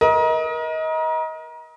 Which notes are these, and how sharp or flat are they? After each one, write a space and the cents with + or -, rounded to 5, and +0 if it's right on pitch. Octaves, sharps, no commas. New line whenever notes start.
A#4 +35 D#5 +25